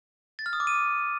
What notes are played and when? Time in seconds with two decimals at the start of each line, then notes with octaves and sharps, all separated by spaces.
0.39 A6
0.46 F6
0.53 D#6
0.60 D6
0.67 D#7